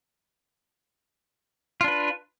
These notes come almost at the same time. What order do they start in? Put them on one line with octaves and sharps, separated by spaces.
F4 D4 B4